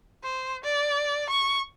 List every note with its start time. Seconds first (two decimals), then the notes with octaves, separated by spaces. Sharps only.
0.24 C5
0.64 D5
1.30 C#6